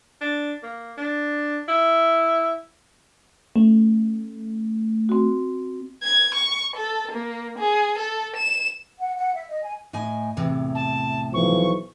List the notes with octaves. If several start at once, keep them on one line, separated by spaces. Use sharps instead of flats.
D4
A#3
D4
E4
A3 C#4
C4 F#4
G#6
C#6
A4
A#3
G#4
A4
E7
F#5
F#5
E5
D#5
G#5
A2 D#5 G#5
E2 A2 C3
A5
B1 E3 F3 C#6